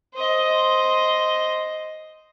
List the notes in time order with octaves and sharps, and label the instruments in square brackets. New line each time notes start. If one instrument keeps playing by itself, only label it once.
[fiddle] C5 D#5